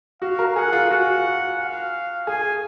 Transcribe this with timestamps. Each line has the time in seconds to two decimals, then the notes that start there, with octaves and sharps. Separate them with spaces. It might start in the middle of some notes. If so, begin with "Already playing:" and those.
0.22 F#4 F5
0.39 A#4
0.56 G#4 F#5
0.73 F4
0.91 F#4 F#5
1.59 F5
2.27 G#4 G#5